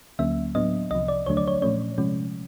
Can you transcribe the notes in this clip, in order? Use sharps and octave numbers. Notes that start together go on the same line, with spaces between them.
D2 D3 F#3 A#3 C#4 E5
A2 F#3 B3 D4 D#5
C2 C3 F3 D#5
D5
D#2 D3 F#3 A3 D4 C#5
D5
C#5
A#2 F3 A3 C#4 C#5
C3 F3 G#3 C#4